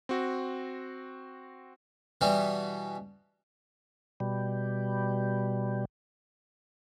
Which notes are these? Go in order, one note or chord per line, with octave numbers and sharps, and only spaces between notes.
C4 F#4
B2 E3 G3 B3
B2 G3